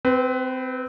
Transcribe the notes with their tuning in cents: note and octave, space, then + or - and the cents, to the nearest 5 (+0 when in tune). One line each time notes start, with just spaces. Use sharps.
C4 -20 B4 +20